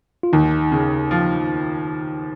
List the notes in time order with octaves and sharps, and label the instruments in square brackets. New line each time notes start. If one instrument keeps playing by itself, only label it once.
[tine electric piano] F4
[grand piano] D#2 [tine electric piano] D#4
[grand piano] C#3
F3